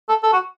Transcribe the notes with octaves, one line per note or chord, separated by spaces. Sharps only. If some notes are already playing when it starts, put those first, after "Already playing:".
A4
A4
F#4